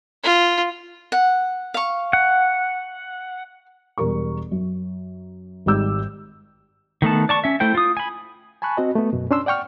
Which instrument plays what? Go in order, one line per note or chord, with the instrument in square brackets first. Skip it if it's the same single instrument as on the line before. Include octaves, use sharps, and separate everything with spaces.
[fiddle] F4
[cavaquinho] F#5
F5 C#6
[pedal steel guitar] F#5
[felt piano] E1 G3 A#4 C#6
F#2
G#1 G#2 G3 D6 E6 G6
[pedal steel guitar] D#3 A3 B3 A5
D5 A5 C#6
C#4 E5
A3 E4 C5 G5
F4 D#6
G#5 B5
[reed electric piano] G#5 A5 B5 C#6 F#6
C4 F#4 D#5
A3 B3
F#2 B2
C#4 D4 C6 E6
D5 F#5 G5 C#6 F6